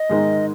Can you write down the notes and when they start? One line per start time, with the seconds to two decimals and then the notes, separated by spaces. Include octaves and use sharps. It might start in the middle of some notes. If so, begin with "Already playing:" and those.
Already playing: D#5
0.09 G#2 D#3 G#3 D#4 A#4